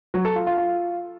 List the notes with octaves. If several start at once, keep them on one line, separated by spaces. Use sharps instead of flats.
F#3
A4
F4
F4
F4